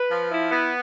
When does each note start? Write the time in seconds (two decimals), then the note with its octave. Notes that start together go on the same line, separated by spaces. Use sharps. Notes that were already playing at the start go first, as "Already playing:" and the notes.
Already playing: B4
0.11 F3
0.31 E4
0.51 B3